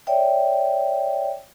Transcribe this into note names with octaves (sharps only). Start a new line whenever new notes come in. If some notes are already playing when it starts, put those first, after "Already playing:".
C#5 D5 E5 G5